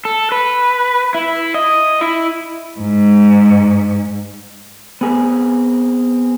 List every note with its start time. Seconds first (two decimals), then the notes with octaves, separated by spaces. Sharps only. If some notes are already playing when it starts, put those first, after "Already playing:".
0.05 A4
0.32 B4
1.15 E4
1.54 D#5
2.01 E4
2.79 G#2
5.01 B3 C4 G#4 A#4 B4